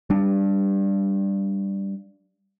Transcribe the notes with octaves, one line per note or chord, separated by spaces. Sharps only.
G3 D4